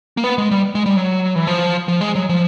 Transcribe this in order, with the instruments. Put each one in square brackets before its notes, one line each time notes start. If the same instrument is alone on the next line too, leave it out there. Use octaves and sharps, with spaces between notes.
[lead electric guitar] A#3
B3
G#3
G3
G#3
G3
F#3
E3
F3
F3
G#3
F#3
F3